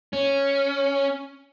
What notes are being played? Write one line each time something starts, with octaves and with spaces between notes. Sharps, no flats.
C#4